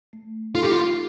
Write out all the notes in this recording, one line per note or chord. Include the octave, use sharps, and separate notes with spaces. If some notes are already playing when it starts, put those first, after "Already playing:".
A3
D#4 F4 A4
G4
F4